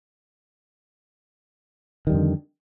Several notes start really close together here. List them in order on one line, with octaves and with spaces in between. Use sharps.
D#3 G3 F2 D3